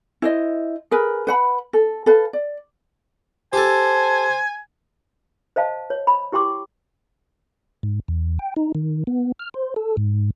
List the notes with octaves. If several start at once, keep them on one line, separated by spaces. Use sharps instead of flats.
E4 C5 D#5
G#4 A#4 B4
B4 F#5 B5
A4
A4 B4 F5
D5
G4 A4 C5 G#5 A5
C5 D#5 F5 A5
C#5
B5
E4 G4 G5 C6 D6
G#2
E2
G5
D#4
D#3
B3
F6
C5
A4
G#2